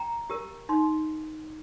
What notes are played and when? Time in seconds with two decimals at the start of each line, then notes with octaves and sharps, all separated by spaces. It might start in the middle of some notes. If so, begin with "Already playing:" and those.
Already playing: G5 A#5
0.30 G4 A#4
0.69 D#4 C6